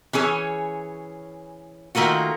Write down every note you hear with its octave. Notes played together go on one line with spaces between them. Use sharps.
E3 C#4 G#4 C#5
D#3 A3 A#3 F4 F#4